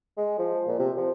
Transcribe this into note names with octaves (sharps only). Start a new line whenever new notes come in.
G#3
F3
A#2
C3
F3